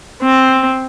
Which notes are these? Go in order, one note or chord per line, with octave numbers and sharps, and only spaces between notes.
C4